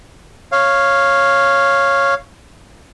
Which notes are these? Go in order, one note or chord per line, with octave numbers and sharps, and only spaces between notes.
C#5 F5